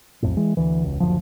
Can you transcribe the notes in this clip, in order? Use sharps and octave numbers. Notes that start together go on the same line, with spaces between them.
B1 F2 A2
E3 G#3
D2 E3
E1 C#2
F#1 D2 F3